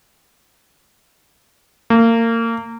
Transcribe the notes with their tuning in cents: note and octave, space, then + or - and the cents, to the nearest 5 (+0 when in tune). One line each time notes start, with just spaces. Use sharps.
A#3 -30